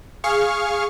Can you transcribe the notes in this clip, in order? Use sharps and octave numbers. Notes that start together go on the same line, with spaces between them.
G#4 F5 C#6 F6